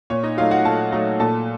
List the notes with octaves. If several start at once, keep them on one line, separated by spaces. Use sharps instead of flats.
A#2 C#5
D#4 D#5
F#3 A3 D#4 F4 F5
F#4 F#5
A#2 A4 A5
F#3 A3 D#4
A#2 A4 A5